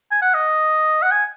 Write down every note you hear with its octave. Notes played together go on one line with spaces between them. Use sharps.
G#5
F#5
D#5
F#5
G#5